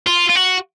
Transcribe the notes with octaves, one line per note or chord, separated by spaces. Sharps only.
F4
F4
F#4